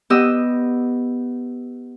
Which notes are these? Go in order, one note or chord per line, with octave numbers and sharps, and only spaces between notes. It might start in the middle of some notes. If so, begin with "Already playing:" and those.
B3 G4 D#5 E6